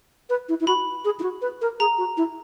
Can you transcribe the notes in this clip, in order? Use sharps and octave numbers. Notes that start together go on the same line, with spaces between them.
B4
E4
E4
F#4 B5
G#4
E4
F#4
B4
A#4
G#4 A#5
F#4
E4